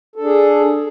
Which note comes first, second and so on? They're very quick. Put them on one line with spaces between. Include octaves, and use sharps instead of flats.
A4 D4 G#4